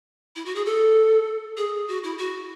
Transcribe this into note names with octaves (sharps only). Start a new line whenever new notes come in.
E4
F#4
G#4
A4
G#4
F#4
E4
F#4